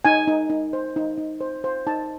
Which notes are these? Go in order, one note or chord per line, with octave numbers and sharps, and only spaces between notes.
D#4 G#5
D#4
D#4
C5
D#4
D#4
C5
C5
D#4 A5